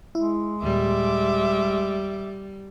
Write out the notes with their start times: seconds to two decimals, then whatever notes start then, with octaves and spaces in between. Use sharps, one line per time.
0.15 G#3 E4
0.63 D#2 A#2 G3 E5 D6